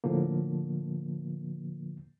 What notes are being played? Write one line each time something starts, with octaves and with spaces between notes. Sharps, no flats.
A2 D3 F3 A#3